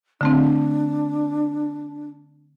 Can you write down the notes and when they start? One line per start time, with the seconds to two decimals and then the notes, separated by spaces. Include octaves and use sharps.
0.21 D3 A3 C4 D4